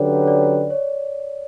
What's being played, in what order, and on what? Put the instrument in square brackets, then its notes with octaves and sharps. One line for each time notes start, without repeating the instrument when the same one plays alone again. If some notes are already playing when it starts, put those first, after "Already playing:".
Already playing: [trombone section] D3 F#3 C#4 G4 B4 [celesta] D5
[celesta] D5
C#5